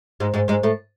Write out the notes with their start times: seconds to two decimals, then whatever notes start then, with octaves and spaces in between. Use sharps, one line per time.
0.20 G#2 G#3
0.34 G#2 G#3
0.48 G#2 G#3
0.63 A2 A3